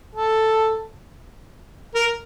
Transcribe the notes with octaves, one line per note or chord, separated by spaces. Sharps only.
A4
A#4